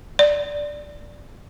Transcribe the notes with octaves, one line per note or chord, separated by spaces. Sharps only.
D5